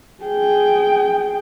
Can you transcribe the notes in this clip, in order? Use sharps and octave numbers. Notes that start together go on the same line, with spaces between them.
G#4 G5